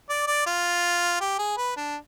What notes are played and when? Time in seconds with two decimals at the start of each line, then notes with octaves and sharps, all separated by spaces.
0.09 D5
0.27 D5
0.46 F4
1.20 G4
1.39 G#4
1.57 B4
1.77 D4